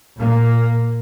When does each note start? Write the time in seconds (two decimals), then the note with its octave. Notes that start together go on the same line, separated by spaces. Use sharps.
0.18 A#2 A#3